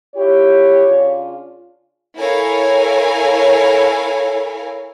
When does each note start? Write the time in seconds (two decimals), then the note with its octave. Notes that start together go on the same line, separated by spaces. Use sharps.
0.15 E4 F4 G4 C#5
0.86 C#3 D4 F4
2.18 E4 A4 A#4 C#5 F5 G#5